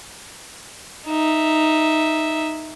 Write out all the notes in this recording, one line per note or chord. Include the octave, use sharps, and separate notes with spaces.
D#4 E5